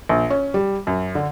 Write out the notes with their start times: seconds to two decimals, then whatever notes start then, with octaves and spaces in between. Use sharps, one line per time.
0.09 A#1
0.30 C#4
0.54 G3
0.87 F#2
1.15 D3